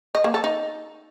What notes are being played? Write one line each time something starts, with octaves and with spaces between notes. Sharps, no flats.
D#5
A#3
A4
D#4